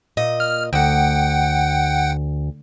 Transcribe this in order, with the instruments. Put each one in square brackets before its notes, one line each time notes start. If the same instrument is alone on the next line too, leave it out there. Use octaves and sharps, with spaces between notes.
[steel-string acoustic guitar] A#2 D#5
[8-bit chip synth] F6
[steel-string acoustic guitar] D2 [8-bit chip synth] F#5 G5